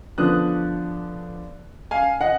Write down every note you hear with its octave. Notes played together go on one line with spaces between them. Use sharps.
D3 F3 B3 D4 D#6 F#6
F5 G#5
D#5 F#5